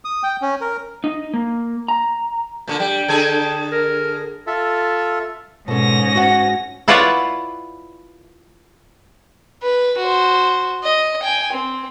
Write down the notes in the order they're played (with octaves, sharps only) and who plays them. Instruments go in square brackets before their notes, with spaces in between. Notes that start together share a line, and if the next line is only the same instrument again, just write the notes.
[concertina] D#6
G5
C#4
A#4
[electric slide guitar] D#4
A#3
A#5
[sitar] A#2 D3
[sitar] G3 [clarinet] G5
[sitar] D3 G#4 A4
[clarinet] A#4
[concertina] F4 A4 E5
[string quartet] G#2 C#4 A#6 [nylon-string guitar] B2 A4
[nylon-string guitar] F#4 F#5
[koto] E4 F4 B4 C#5 D5 F#5
[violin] B4
F#4 C5
D#5
G5 G#5
C4